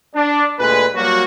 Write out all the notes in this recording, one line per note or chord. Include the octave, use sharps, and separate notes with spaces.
D4
D2 A#2 G#3 B4
F#3 G3 A#3 F#4